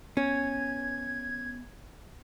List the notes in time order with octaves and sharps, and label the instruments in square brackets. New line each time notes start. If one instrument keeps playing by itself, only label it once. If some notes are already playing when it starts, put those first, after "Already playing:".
[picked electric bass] B3 [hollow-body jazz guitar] C#4 [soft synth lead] G#6